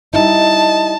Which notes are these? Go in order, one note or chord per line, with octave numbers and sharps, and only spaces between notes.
G3 D#4 E4 D#5 A5